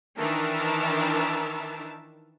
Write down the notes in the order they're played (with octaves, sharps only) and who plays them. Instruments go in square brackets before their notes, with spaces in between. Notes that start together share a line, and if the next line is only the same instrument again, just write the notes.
[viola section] D#3 E3 D4 A#4 E5 A5